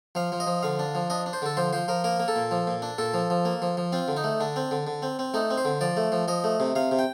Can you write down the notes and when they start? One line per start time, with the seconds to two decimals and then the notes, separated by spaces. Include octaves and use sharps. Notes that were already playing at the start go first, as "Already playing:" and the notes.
0.15 F3 F5
0.32 F3
0.40 D#5
0.47 F3
0.63 D3 F5
0.79 D4
0.95 F3
1.10 D4 D#5
1.26 D4
1.33 C5
1.42 D3 A4
1.57 F3 C5
1.73 F3 C5
1.88 F3 A#4
2.04 A#3 A#4
2.20 A#3
2.28 A4
2.36 A#2
2.51 F3
2.67 A#2
2.82 D4
2.98 A#2 A4
3.14 F3
3.30 F3
3.45 A#3
3.62 F3
3.77 F3
3.92 C4 F4
4.08 D3
4.17 D#4
4.24 A3
4.40 D3 D4
4.56 C4
4.71 D3
4.87 D3
5.02 C4
5.19 C4
5.34 A3 D#4
5.50 C4
5.58 C5
5.65 D3
5.81 F3 D5
5.97 A3
6.12 F3
6.28 F3 D#5
6.44 A3
6.60 C3
6.75 C3 F5
6.91 C3
6.99 G5